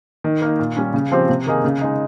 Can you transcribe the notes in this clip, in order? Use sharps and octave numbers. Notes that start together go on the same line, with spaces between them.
D#3
A#3 D#4
A#2
G3 C#4
C#3
F3 C4 G4 C5
C3
D#3 A#3 D#4 G#4
C#3
G#3 D#4